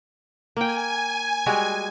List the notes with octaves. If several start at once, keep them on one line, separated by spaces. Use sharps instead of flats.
A#3 G5 G#5
G3 G#3 F#4